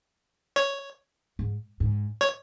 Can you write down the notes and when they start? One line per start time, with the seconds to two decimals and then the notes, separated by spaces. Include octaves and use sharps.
0.56 C#5
1.39 G#2
1.80 G#2
2.21 C#5